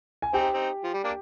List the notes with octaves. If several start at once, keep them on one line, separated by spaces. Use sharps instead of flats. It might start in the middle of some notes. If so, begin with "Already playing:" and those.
G#5
C4 D#4 G4 G5
C4 D#4
F3
G3
A#3 D4